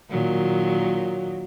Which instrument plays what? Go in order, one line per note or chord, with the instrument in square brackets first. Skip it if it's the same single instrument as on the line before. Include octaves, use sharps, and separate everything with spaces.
[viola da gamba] A#2 D#3 F#3